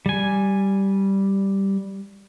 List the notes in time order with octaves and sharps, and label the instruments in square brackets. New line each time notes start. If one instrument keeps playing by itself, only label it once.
[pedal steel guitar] G3 G#5